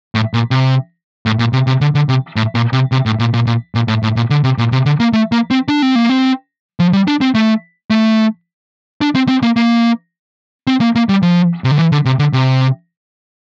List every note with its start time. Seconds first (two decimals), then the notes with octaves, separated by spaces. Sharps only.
0.15 A2
0.34 A#2
0.51 C3
1.26 A2
1.39 A#2
1.53 C3
1.67 C3
1.81 D3
1.95 D3
2.09 C3
2.36 A2
2.55 A#2
2.73 C3
2.92 C3
3.06 A2
3.19 A#2
3.34 A#2
3.47 A#2
3.75 A#2
3.88 A2
4.03 A2
4.16 A#2
4.30 D3
4.44 C3
4.58 A#2
4.72 C3
4.86 D3
5.00 A#3
5.13 A3
5.32 A#3
5.51 C4
5.68 D4
5.82 C4
5.95 A#3
6.10 C4
6.80 F3
6.93 G3
7.08 D4
7.21 C4
7.35 A3
7.90 A3
9.01 D4
9.15 C4
9.28 C4
9.43 A#3
9.56 A#3
10.67 C4
10.81 A#3
10.95 A#3
11.09 G3
11.22 F3
11.64 C3
11.71 D3
11.79 E3
11.92 D3
12.05 C3
12.19 D3
12.33 C3